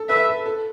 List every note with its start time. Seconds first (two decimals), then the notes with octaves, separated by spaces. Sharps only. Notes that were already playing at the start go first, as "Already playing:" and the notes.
Already playing: A4
0.09 B4 E5
0.28 A4
0.46 A4